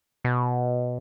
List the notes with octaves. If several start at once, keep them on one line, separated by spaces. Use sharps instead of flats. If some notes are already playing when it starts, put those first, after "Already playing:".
B2